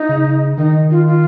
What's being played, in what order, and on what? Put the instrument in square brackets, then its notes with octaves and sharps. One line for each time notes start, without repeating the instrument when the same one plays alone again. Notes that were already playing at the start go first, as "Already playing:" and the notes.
Already playing: [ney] D#4
[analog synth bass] C#3
[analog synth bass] D#3 [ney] D#4
[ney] F4
F4